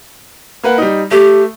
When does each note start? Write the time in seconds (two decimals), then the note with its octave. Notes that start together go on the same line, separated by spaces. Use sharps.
0.63 A#3 B4 F#5
0.78 G3 D#4
1.11 A3 G4